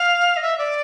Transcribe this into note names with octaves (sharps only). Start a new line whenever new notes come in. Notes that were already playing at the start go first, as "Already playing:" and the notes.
Already playing: F5
D#5
E5
D5